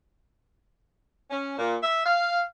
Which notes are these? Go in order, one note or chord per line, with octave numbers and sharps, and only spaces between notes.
C#4
A#2
E5
F5